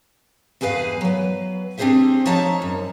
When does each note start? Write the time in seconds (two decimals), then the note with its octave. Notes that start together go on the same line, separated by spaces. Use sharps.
0.61 E2 G2 G#4 B4 F5
1.01 F#3 B4
1.77 C4 D4 G4 G#4 C5 E5
2.26 F3 D#4 C#5 E5 A5 A#5
2.62 F#2